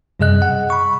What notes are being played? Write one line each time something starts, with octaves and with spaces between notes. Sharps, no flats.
F#2 C3 G3 G#4 D#5 F#6
F#5
B5 C#6